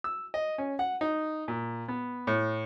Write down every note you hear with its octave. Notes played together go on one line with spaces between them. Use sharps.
E6
D#5
C#4
F#5
D#4
A#2
B3
A2